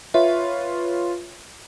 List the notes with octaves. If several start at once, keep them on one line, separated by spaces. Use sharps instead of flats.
F4 B4 C#5 E5